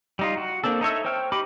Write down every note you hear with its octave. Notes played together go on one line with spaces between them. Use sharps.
G3 D#4 F4
F#4
A#3 C4 D4 A4
D#4 A4 C#5 E5
C5 C#5 G5 F6
D#4 G4 B5 D6